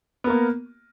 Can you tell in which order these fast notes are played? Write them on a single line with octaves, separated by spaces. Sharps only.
B3 A#4 A#3